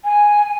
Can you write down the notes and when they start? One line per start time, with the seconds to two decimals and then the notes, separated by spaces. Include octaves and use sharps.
0.04 G#5